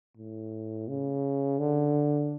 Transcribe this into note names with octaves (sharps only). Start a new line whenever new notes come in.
A2
C#3
D3